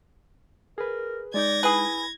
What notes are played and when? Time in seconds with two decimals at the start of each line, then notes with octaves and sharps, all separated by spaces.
0.78 G#4 A#4 B4
1.34 G#3 D#4 D5 G6 G#6 A#6
1.63 E4 G#4 B4